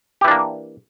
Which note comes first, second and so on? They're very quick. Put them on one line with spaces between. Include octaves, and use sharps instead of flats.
G4 E3 D4 A#3